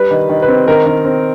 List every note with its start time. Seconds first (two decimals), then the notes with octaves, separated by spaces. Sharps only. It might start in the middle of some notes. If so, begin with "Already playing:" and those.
Already playing: G3 B4
0.11 D#3
0.29 D#3
0.42 B4
0.48 C4
0.68 D#3 A#4
0.86 D#3
1.05 C4